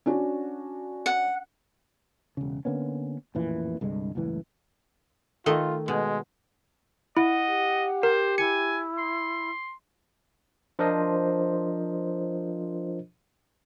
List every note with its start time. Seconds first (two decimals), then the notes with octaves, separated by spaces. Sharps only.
0.06 C#4 D4 F#4
1.06 F#5
2.37 E1 C#3
2.65 D3 A#3 B3 C#4
3.35 A1 F2 A#2 E3
3.81 C2 G2 D3 G#3
4.15 F#1 C#2 A2 E3
5.46 D#3 A3 F4 D#5
5.88 B2 G#3
7.17 E4 D#5 F#5
7.49 G4
8.03 A#4 C5
8.38 E4 G#5 C#7
8.98 C6
10.79 F3 D4 F4 A#4 C5 D#5